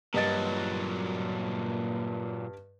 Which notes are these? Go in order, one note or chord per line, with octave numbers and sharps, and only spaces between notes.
G2 A#2 F#3 D#5 A6